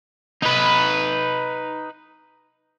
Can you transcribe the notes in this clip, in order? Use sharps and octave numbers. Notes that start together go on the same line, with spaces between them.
D#4 B4